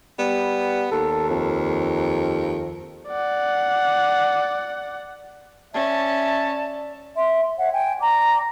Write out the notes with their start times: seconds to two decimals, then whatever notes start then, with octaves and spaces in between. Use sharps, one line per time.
0.19 G3 B3
0.92 D#2 A4
1.30 F2
3.08 D5 F#5
5.74 C#4 D5 E5 A5
7.15 E5 C6
7.57 C#5 E5 F#5
7.72 G5 G#5
8.00 D5 A#5 D6